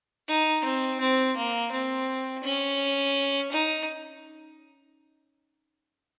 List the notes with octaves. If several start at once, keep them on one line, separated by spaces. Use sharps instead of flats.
D#4
C4
C4
A#3
C4
C#4
D#4